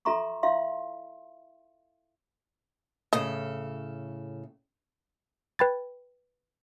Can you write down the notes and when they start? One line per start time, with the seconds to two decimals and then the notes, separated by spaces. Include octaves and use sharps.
0.05 F4 A4 E5 A#5 C6 C#6
0.43 E4 F4 E5 F5 C6
3.13 A2 C#3 A4 D#5
5.59 B4 G5 B5 G#6 A6